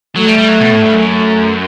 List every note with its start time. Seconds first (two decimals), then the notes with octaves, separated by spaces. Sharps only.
0.16 F#3 A3
0.27 G3
0.39 G3
0.49 F#3
0.61 B2
0.71 A2
0.83 G2
0.94 F#2
1.05 A3